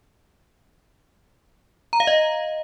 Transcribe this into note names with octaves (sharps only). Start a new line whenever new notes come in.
A#5
F5
D#5